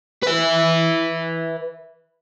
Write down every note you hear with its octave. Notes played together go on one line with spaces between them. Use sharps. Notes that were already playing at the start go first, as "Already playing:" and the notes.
B4 E5